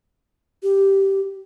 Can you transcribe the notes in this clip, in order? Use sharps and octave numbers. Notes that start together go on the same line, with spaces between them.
G4